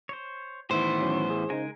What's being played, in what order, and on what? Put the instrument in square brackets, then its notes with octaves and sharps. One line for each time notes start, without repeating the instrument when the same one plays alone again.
[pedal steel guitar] C5 C#5
[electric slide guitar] A2 E3 B3 [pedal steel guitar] D#3 E4 [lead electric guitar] C5
[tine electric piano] F#3 C#4
G#4
[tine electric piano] C#3 D#4 [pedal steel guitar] G#3 A#4 G#5